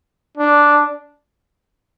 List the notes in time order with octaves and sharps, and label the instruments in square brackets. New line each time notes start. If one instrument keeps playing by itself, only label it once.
[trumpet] D4